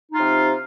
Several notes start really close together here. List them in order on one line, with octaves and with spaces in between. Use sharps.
D#4 F4 C3